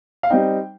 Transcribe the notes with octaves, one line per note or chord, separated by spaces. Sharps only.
F5
G3 C4 D#4 G5